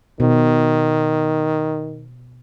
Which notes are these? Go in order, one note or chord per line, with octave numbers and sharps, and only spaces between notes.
B2 D#3 C5